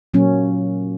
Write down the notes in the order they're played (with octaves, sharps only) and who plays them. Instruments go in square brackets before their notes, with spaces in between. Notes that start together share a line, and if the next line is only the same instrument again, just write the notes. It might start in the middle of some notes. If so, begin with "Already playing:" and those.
[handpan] A#2 F#3 A#3 C#4